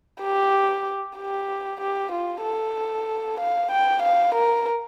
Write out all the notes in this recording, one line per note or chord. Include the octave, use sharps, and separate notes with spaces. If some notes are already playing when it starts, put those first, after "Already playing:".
G4
G4
G4
F4
A4
F5
G5
F5
A#4